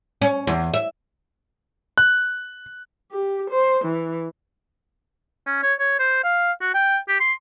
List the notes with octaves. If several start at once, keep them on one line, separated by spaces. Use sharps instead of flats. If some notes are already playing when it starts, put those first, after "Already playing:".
C#4
E2
E5
F#6
G4
C5
E3
C#4
C#5
C#5
C5
F5
F#4
G5
G4
C6